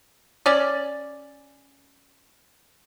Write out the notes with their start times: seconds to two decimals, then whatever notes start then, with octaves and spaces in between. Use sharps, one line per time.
0.46 C#4 D5